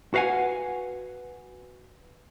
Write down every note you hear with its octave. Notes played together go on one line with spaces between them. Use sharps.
F#4 B4 F5 F#5 G#5